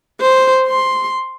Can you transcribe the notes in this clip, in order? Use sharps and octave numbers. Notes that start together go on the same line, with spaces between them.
C5
C6